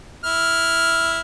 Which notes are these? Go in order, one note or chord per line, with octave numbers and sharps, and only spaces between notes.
E4 F6